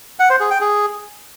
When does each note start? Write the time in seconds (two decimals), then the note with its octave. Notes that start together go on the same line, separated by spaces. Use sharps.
0.19 F#5
0.30 C5
0.40 G#4
0.51 G5
0.61 G#4